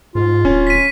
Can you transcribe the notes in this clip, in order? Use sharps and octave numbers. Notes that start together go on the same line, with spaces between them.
G#2 F4
D1 C#4
B6 D#7